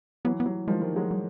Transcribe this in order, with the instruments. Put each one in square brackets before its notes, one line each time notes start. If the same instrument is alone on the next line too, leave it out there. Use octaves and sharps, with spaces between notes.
[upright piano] E3 F#3 [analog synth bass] B3
[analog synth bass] B3
[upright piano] E3 F#3
[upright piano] D#3 F3 [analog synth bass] G#3
[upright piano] D#3 F3
F#3 G#3
[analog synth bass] G3